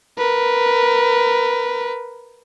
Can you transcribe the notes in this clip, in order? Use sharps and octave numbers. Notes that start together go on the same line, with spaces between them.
A#4 B4